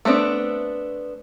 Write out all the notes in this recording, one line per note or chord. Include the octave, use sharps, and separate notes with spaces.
A3 B3 C4 D4